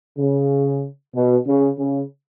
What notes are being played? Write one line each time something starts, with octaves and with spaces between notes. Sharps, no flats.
C#3
B2
C#3
C#3